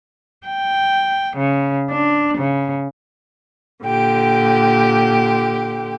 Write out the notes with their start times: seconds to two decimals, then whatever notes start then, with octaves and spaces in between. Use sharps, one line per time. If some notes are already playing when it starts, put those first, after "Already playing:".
0.47 G5
1.37 C#3
1.91 D4
2.38 C#3
3.84 A#2 D3 G4 G5